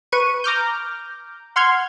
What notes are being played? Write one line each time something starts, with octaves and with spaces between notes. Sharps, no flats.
B4 C#6 D#7
A#5 D6 F6 G6
F#5 C6 F6 G#6